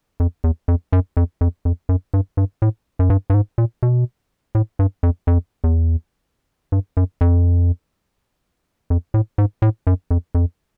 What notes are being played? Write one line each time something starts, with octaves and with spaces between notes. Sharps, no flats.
F2
E2
F2
F#2
F2
F2
F2
F#2
G2
G2
A2
F#2
G2
G2
G#2
A#2
B2
A2
G2
F2
F2
E2
G2
F#2
F2
F2
A2
G#2
A2
F#2
F2
F2